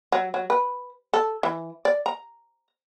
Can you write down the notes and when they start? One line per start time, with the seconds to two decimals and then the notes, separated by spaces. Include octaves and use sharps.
0.12 F#3
0.34 F#3
0.50 B4
1.14 A4
1.43 E3
1.85 D5
2.06 A#5